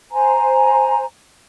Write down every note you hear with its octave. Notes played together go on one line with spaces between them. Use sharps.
C5 G#5 A#5